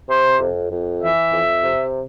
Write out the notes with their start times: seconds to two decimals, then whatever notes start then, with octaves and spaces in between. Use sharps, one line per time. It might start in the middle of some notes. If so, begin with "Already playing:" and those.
0.09 C3 C5
0.40 F2
0.71 F2
1.01 E3 E5
1.33 F2
1.63 C3